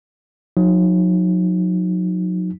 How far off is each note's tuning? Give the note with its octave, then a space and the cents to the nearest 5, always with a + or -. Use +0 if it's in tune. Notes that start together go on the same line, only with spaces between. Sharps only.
F#3 -35 D#4 +0